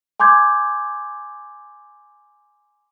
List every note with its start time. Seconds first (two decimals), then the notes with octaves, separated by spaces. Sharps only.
0.20 G#5 C6 D6 G6 G#6